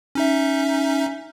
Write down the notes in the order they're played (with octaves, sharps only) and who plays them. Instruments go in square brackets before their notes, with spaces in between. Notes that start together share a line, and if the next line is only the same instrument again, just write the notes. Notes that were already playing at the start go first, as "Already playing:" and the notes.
[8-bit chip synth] C#4 D#4 E5